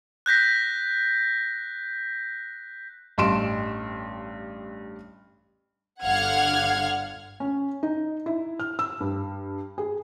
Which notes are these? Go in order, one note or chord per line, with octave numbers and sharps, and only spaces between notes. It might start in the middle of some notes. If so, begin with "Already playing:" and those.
F#6 G6 A#6 B6
A1 G2 C6 D7 E7
G1 D3 F5 F#5 F6 G#6
C#4
D#4
E4
F6
E6
G2
G#4